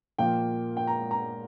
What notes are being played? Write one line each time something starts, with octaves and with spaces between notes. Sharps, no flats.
A#2 F3 A#3 F4 G5
G5
A#5
A#5